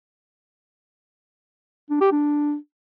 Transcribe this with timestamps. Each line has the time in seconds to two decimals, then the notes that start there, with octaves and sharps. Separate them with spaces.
1.90 D4
2.01 G4
2.12 D4